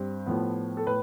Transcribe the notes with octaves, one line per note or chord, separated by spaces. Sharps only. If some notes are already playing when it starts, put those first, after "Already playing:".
Already playing: G2 C4 G4
A2 F3 B3
A4
A2 B4